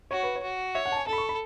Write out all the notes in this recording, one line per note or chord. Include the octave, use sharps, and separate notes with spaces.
F#4 C#5
B4
C#5
F#4
C#5 E5
F#5
A5
G#5
A4 A5
B5
C#6
B5